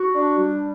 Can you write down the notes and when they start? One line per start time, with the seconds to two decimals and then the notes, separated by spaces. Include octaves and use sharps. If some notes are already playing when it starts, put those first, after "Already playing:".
Already playing: F#4
0.15 D4
0.38 G3